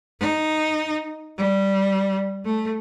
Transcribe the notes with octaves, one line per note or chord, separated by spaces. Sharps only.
D#4
G3
A3